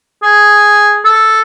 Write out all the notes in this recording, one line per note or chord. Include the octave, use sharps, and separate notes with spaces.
G#4
A4